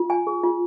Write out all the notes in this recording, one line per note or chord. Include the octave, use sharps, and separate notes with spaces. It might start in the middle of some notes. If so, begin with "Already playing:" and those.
Already playing: F4
G#5
G#4
F4